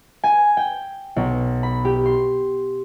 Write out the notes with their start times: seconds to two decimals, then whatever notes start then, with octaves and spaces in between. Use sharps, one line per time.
0.24 G#5
0.57 G5
1.16 B1
1.63 B5
1.85 G4
2.06 C6